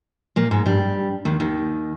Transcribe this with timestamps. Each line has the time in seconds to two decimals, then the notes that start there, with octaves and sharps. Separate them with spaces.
0.36 A#2 A#3
0.51 G#2 G#3
0.66 G2 G3
1.25 D#2 D#3
1.40 D#2 D#3